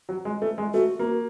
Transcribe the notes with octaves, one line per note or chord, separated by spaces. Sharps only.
F#3
G#3
A3
G#3
A3 F#4
A#3